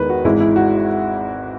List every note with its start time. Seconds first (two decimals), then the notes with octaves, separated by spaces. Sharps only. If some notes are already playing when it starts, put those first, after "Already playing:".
Already playing: E2 D#3 G#3 B3 B4
0.09 F#4
0.24 G#1 G#2 E3 G#3 E4
0.40 E4
0.56 F#4